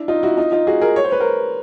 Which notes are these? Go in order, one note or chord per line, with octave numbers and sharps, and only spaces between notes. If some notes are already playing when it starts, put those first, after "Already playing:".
Already playing: D4 E4
D#4 F4
E4 F#4
D#4 F4
D#4 F4
F#4 G#4
G#4 A#4
C#5
C5
B4
A#4 C5